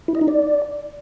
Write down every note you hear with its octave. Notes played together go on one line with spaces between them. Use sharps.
E4
D#5
D#4
D5